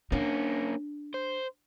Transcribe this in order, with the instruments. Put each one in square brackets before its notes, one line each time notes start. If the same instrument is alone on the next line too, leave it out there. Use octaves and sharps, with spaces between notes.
[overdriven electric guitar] A#3 C#4 [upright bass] D4
[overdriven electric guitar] C5